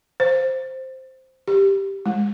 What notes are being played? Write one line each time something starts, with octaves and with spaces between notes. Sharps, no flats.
C5
G4
G#3